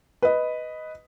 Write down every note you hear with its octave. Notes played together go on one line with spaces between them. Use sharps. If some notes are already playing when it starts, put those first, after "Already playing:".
B4 D#5